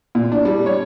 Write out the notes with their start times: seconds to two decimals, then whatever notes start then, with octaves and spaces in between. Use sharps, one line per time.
0.15 A#2
0.32 D4
0.45 G3
0.66 C#5